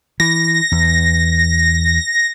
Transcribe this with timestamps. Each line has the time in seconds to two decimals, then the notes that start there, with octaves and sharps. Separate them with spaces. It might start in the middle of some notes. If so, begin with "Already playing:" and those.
0.20 E3 A#6
0.72 E2